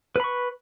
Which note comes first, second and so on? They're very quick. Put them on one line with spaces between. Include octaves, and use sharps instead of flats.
B4 B5 C#6